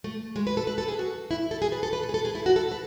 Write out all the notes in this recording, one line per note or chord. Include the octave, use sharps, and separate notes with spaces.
A3
G#3
B4
A4
B4
A4
G#4
F#4
E4
A4
G#4
B4
A4
B4
A4
G#4
A4
G#4
E4
F#4
A4
B4